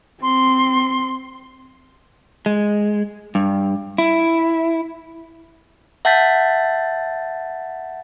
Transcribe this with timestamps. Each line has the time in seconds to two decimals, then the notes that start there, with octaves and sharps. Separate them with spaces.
0.22 C4 C6
2.46 G#3
3.35 G2
3.98 E4
6.05 E5 F#5 A5 G6 A6 B6